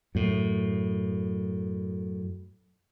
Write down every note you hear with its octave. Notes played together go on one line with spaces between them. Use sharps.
F#2 A2